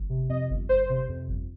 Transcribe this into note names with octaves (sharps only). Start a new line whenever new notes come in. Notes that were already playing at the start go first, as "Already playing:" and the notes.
Already playing: G1
C3
F2 D#5
G1
G1 C5
C3
F2
G1